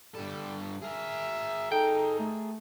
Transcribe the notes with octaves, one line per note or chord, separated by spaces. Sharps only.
G2 G3 A4
G#4 A#4 E5
D#4 A4 G5
A3